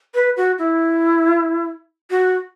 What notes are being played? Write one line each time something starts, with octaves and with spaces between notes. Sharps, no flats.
B4
F#4
E4
F#4